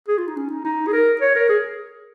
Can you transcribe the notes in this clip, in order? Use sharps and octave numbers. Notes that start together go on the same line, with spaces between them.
G#4
F4
D#4
C#4
D#4
D#4
G#4
A#4
C#5
A#4
G#4